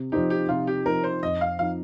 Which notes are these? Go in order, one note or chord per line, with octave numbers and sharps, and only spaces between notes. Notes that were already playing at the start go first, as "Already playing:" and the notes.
Already playing: C3
F3 C4 D#4 G4
G4
C3 F4
G4
F3 C4 D#4 A#4
C5
F2 D#5
F5
F3 D#4 F5